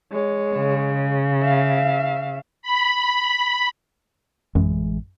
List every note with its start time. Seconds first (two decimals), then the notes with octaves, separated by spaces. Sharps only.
0.11 G#3 C#5
0.55 C#3
1.42 E5 F5
2.62 B5
4.55 A1 F#2 E3 G#3